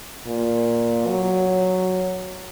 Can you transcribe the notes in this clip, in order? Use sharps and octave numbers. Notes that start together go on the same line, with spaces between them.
A#2
F#3